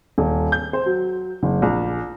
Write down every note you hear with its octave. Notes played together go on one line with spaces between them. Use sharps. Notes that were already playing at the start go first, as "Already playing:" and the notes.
D#1
G6
C5
F#3
F#1
A#1